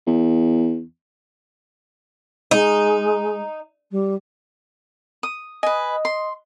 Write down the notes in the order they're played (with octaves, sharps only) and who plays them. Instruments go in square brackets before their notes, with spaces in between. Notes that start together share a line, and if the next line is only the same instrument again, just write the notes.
[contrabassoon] E2
[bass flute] G#3 [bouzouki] D#4
[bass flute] G3
[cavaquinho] D#6
[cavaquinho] B4 G#5 [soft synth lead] D#5
[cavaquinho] C6